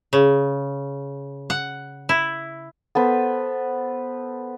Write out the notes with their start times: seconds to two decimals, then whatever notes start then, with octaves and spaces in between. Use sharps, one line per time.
0.13 C#3
1.50 F#5
2.09 E4
2.95 B3 A4 B4 C5